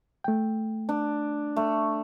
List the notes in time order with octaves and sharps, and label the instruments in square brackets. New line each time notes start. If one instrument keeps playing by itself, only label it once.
[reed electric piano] A3 G5
[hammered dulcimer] D4
A3